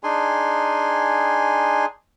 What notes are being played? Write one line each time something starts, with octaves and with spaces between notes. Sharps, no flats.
D4 D#4 G#4 G#5 C6